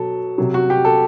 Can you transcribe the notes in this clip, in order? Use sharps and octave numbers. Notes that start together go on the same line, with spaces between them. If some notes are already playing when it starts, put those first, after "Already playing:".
Already playing: B2 F#3 A4
C3 F#3
F#4
G4
A4